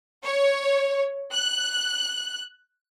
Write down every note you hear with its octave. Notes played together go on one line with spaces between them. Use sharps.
C#5
F#6